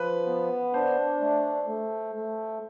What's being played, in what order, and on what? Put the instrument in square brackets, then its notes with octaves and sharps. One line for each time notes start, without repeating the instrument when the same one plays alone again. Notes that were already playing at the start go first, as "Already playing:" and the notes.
Already playing: [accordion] F3 [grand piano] B4
[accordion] B3
[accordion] D4 [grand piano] C5
[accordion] A3
A3
A3